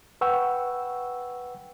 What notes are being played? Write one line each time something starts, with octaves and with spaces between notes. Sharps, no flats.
B4 F#5 G5 C#6 E6